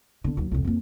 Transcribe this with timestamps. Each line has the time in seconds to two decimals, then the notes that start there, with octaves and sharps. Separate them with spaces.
0.24 D3 B3
0.37 D#2 F#3
0.52 C2 F2
0.65 F2 A#3